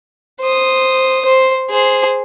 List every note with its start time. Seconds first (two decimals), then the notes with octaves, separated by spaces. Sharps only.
0.41 C5 D#6
1.25 C5
1.70 G#4 C5